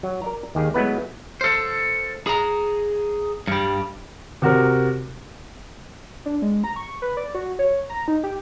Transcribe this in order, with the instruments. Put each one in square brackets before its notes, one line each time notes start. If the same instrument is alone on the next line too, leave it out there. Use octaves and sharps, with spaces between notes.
[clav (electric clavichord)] F#3
A#4 D5 A#5
D#2 D#3 G4 G#4
F#3 G#3 A3 B3 E4 B4
[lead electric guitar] A4 C5
G#4 A#5
G2 G3
[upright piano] C3 F#4 A#4 C5
[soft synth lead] D4
G#3
A#5
C#6
B4
D5
F#4
C#5
A#5
D#4
G4